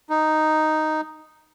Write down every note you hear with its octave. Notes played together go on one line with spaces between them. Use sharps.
D#4